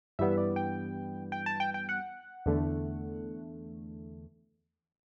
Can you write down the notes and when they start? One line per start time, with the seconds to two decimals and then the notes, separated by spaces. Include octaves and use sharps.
0.19 G2 E3 G3 B3 E5
0.38 D5
0.56 G5
1.32 G5
1.46 A5
1.60 G5
1.74 G5
1.89 F#5
2.46 E2 D3 A3